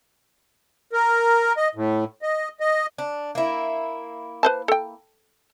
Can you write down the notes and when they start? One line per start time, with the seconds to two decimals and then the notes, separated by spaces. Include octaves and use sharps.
0.93 A#4
1.57 D#5
1.75 A2
2.22 D#5
2.60 D#5
2.98 D4
3.35 A#3 E4
4.43 B4 C5 A5
4.68 A4 G5